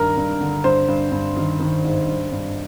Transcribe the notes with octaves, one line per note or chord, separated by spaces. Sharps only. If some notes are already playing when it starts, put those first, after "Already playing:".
Already playing: G2 D#3 A#4
G2
D3
G2 C5
G2
G2
D#3
D#3
G#2
G2
G2